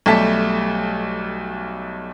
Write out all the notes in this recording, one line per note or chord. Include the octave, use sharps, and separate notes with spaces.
B1 G3 A3 G4 A5 B6